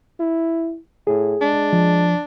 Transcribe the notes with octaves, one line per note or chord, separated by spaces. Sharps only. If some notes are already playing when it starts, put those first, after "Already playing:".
E4
A2 G#4
G#3 D4
F3